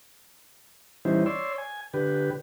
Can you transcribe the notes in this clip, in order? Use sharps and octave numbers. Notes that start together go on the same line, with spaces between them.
E3 G3 C#4 D#4 E4 C5
C#5 D5 C6 E6
G#5
D3 G4 B4